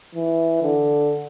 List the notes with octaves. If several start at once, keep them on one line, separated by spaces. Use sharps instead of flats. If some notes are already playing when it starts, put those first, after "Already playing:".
E3
D3